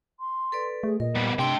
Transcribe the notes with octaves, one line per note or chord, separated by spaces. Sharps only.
C6
A4 B4 D5
A3 G#4
A#2 A#4 D#5
B2 G3
C3 A3 D4 D#5 G5 C6 E6